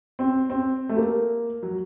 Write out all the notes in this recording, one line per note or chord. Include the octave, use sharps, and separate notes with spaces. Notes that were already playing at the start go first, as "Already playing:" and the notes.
C4
C4
A3
A#3
F#3